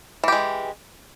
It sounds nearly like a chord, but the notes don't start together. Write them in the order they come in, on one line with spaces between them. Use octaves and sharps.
E3 G4 G#3